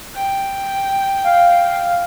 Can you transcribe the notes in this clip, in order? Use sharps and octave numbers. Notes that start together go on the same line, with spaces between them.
G5
F5